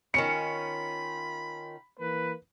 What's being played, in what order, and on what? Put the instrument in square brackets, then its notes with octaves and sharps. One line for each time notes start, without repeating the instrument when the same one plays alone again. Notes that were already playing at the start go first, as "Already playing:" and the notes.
[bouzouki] D#3 C#4 F4 [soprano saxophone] B5 [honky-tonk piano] C#7
[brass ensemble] E3 A#3 B4